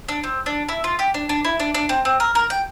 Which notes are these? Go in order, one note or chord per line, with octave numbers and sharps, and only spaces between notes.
D4
C4
D4
E4
F4
G4
D4
D4
E4
D4
D4
C4
C4
A#4
A#4
G5